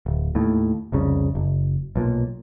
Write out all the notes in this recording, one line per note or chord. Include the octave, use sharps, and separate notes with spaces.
D1
D#2 A2
F1 C2 C#3
F#1
B1 A#2